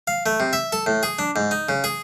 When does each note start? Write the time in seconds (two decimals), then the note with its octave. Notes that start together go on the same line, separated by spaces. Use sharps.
0.07 F5
0.26 A3
0.40 C3
0.53 E5
0.73 A4
0.86 A2
1.03 G#4
1.19 D4
1.36 G#2
1.51 D#4
1.69 C#3
1.84 G#4